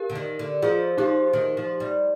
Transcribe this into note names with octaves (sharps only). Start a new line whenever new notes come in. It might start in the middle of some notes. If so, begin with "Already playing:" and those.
Already playing: G4 A#4
D3
D#3
D3
F3 F4 G#4
F3 D#4 G4
D#3
F3
G3